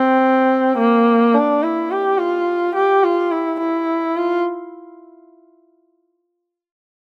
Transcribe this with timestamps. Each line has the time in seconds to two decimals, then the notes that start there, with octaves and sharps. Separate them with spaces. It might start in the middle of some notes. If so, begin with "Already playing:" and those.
Already playing: C4
0.78 A#3
1.34 D4
1.63 E4
1.91 G4
2.18 F4
2.76 G4
3.04 F4
3.31 E4
3.60 E4
4.17 F4